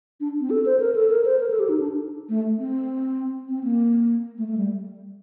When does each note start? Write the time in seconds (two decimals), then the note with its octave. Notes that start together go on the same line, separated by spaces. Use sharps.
0.20 D4
0.41 C4
0.50 A4
0.66 C5
0.80 A#4
0.95 A4
1.10 A#4
1.25 C5
1.39 A#4
1.51 A4
1.60 G4
1.69 D#4
1.80 D4
2.29 A3
2.59 C4
3.49 C4
3.64 A#3
4.38 A3
4.48 A3
4.58 G3